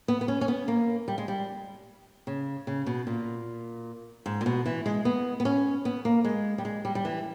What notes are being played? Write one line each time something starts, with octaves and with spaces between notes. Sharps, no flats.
B3
B3
C#4
C#4
B3
A#3
G3
G#3
G3
C#3
C#3
B2
A#2
G#2
A#2
B2
E3
G#3
B3
B3
C#4
B3
A#3
G#3
G3
G#3
G3
G3
E3